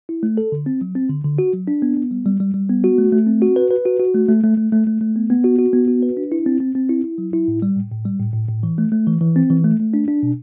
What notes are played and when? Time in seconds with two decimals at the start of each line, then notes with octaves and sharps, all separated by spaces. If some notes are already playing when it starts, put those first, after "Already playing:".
0.09 E4
0.23 A3
0.37 A4
0.52 D3
0.66 C4
0.81 F#3
0.95 C4
1.10 D3
1.24 D3
1.39 F#4
1.53 F#3
1.68 D4
1.82 B3
1.97 B3
2.11 G3
2.26 G3
2.40 G3
2.54 G3
2.69 B3
2.84 F#4
2.98 A3
3.13 A3
3.27 C4
3.42 F#4
3.56 B4
3.71 B4
3.85 F#4
4.00 F#4
4.14 A3
4.29 A3
4.43 A3
4.57 A3
4.72 A3
4.87 A3
5.01 A3
5.16 B3
5.30 B3
5.44 F#4
5.59 F#4
5.73 B3
5.88 F#4
6.02 B4
6.17 D4
6.32 E4
6.46 C4
6.60 C4
6.75 C4
6.89 E4
7.04 E4
7.18 F#3
7.33 E4
7.48 A2
7.62 G3
7.76 A2
7.91 A2
8.05 G3
8.20 A2
8.34 A2
8.48 A2
8.63 E3
8.78 A3
8.92 A3
9.07 E3
9.21 E3
9.36 C4
9.50 E3
9.64 A3
9.80 A3
9.94 D4
10.08 D4
10.23 B2